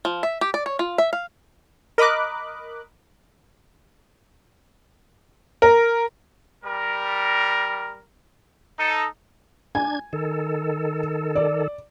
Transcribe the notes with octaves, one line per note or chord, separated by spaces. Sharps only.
F3
E5
G4
D5
C#5
F4
E5
F5
A#4 D#5 B5 D6 F#6
A#4
G3 A#4
D#4 A4
D4 G#5 G#6
D#3 A4
D5